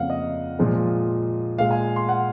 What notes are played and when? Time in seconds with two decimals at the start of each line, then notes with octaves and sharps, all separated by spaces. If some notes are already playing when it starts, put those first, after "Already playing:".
Already playing: F2 C#3 F3 A#3 F5 F#5
0.10 D#5
0.59 A#2 F3 G#3
1.58 A#2 G#3 F5
1.71 G#5
1.96 C6
2.09 F#5